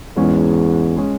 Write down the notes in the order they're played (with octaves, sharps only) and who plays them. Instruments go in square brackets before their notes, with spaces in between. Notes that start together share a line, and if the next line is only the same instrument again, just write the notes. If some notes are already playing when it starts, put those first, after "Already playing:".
[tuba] E2 [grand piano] G#2 G#3 C#4
[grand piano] G#3 C#4